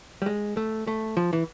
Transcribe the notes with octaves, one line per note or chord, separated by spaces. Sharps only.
G3
G#3
A3
A3
F3
E3